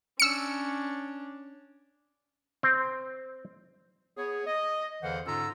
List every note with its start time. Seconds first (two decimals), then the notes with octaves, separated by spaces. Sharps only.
0.20 C#4 D4 E6 C#7
2.63 C4
4.17 B3 G#4 C#5
4.47 D#5
5.02 E2 D3 E3 C5 F5 F#5
5.26 G#2 D3 C#4 F4 A#5 E6